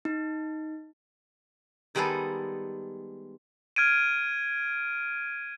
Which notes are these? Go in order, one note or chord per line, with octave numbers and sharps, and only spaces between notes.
D#4
D#3 G3 G#3 B3 G#4 A4
F6 G#6 D7 D#7